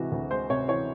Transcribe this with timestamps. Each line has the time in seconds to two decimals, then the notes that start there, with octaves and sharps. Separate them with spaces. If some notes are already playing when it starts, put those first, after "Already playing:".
Already playing: C3 E3 G#3 F#4
0.12 D2
0.31 G#3 C5
0.50 C3 C#5
0.68 E3 C#5